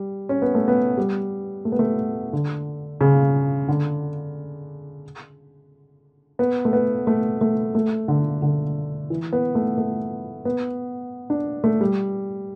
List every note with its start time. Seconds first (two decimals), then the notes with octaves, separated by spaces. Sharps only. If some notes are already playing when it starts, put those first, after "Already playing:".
Already playing: G3
0.29 C#4
0.42 B3
0.55 A3
0.68 B3
0.97 G3
1.65 A3
1.72 B3
1.79 A3
2.33 D3
3.01 C#3
3.68 D3
6.39 B3
6.65 A3
6.73 B3
7.07 A3
7.41 A3
7.75 A3
8.08 D3
8.42 D3
9.10 E3
9.33 B3
9.55 A3
9.78 A3
10.45 B3
11.30 D4
11.64 A3
11.81 G3